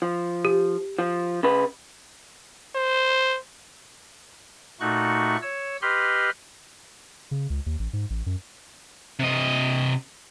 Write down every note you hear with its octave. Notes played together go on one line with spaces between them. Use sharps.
F3
G4
F3
C#3 B4
C5
A#2 A3 D#4 F#4 C#6 F#6
C#5 E6
G4 B4 D#5 B5 C6 F6
C#3
C#2
D#2
A1
G#2
A1
F#2
C3 D#5